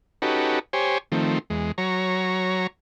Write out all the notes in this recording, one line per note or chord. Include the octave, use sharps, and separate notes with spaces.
C#4 D#4 F#4 G4 A4 B4
G4 C5 C#5 G#5
D#3 F3 A3 C4
E2 G#3
F#3 C#5 A#5